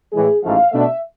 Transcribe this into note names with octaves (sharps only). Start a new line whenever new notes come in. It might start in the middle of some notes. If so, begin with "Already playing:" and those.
A2 E3 G#3 G#4
A1 G#2 F3 A3 F5
B2 A3 D4 E5